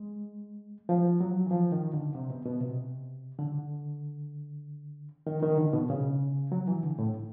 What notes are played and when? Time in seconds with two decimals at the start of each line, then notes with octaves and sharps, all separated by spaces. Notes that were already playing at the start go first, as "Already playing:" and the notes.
Already playing: G#3
0.89 F3
1.21 F#3
1.46 E3
1.51 F3
1.72 D#3
1.93 D3
2.15 C3
2.30 B2
2.45 B2
2.61 C3
3.39 D3
5.27 D#3
5.43 D#3
5.58 D3
5.73 B2
5.90 C#3
6.52 F#3
6.68 E3
6.83 D3
6.99 A2